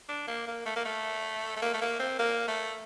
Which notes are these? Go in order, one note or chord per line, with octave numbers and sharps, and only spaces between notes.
D4
A#3
A#3
A3
A#3
A3
A3
A#3
A3
A#3
C4
A#3
A3